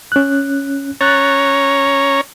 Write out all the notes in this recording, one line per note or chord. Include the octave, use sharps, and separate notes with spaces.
C#4 F#6
C#4 C#5 A#5 F#6 A6